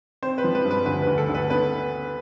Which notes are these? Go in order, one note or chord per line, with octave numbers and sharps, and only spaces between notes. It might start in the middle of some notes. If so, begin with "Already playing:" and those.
C4 C5
B4
F3
B4
G2
B4
D2 B4
B4
D2
A4
D2
B4
B3 B4